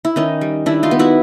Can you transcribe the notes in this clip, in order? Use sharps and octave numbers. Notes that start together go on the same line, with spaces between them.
E4
D#3 C#4 D#4
G3
D#3 D4 E4
D#4 F4
B3
E4 F#4